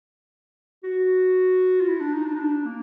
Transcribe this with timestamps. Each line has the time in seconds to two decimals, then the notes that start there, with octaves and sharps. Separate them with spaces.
0.84 F#4
1.80 F4
1.88 E4
2.01 D4
2.14 D#4
2.26 D4
2.35 D#4
2.40 D4
2.66 A#3